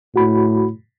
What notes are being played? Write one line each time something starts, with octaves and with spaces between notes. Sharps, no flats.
A2 F#4 B5